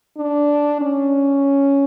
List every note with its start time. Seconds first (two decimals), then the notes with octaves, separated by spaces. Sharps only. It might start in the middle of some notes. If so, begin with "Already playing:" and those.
0.17 D4
0.81 C#4